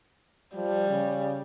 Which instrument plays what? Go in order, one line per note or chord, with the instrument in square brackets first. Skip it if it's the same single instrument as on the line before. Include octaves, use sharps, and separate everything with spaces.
[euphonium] F3 [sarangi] G3
[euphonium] C#3